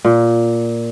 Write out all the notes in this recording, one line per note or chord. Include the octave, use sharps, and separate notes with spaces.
A#2